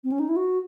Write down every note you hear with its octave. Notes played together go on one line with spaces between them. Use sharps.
C4
C#4
D#4
E4
F#4